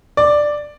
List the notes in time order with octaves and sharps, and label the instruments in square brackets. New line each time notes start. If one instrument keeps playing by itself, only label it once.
[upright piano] D5